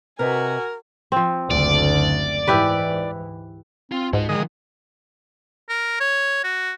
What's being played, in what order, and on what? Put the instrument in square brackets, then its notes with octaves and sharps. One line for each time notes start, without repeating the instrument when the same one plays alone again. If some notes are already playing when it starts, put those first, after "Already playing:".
[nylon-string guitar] C3 B4 D#5 [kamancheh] F#4 G#5 [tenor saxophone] A#4
[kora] F3 C4
[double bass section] F#1 D2 [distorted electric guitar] D5
[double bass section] G#2 E3 [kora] E4 G4 B4
[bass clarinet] C4 [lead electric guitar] F4
[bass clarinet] C#2 [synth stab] G#2 [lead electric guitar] F#4 D#5
[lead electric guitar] D3 F3 [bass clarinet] D#3 [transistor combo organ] G#3 D#5
[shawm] A#4
C#5
F#4